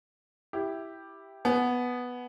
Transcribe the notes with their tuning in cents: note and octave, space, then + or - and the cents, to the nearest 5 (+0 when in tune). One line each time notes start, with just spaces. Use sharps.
E4 +0 G4 +0
B3 +0 G#5 +35